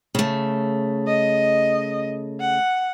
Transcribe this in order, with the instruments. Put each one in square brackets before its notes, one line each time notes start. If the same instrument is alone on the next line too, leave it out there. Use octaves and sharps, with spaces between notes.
[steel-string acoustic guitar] C#3 A3
[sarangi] D#5
F#5